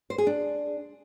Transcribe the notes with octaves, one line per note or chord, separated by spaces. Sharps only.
C5
G#4
D4